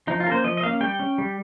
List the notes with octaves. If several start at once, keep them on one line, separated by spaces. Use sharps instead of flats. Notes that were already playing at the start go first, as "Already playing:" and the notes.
F3 D#4
F4
A#3 C#4 A#4 C5
F3 D#5
D#5
A#3 C#4 F5
G3 G5
C#4
G3